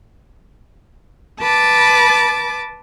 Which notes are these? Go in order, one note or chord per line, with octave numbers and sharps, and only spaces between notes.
B4 A5 D6 A6